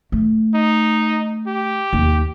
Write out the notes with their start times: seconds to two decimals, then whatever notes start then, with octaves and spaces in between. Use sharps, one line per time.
0.12 A3
0.55 D#4
1.47 G4
1.93 D#2